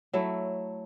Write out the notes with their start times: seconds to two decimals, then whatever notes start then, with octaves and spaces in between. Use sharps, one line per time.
0.13 F#3 A3 E4